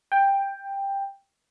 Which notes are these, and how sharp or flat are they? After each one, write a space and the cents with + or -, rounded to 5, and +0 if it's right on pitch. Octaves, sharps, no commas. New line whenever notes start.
G5 +10